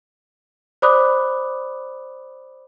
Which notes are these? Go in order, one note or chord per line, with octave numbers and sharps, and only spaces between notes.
C5 D5 B5 D6 D#6 F#6